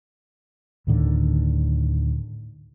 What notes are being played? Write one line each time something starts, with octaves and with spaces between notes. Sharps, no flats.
D2 A2 D3 D#3